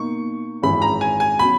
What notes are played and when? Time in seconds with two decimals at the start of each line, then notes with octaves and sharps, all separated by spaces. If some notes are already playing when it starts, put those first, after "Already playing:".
Already playing: B2 A#3 D#4 C#6
0.62 G#1 F#2 E3 G#3 C#4 B5
0.82 A#5
1.01 G#5
1.20 G#5
1.39 B2 F#3 C#4 F#4 B5